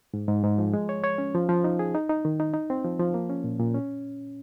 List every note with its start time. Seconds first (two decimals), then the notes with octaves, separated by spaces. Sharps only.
0.14 G#2
0.28 G#2
0.43 G#2
0.59 F3
0.74 G#3
0.89 C#5
1.04 C#5
1.18 C#4
1.35 F3
1.49 F3
1.64 D#4
1.79 G#4
1.95 D#4
2.09 D#4
2.25 D#3
2.40 D#4
2.54 D#4
2.70 C4
2.84 F3
2.99 F3
3.14 A#3
3.30 C#4
3.44 A#2
3.60 A#2
3.74 C#4